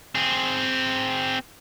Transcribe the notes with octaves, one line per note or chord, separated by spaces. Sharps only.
C4 G#4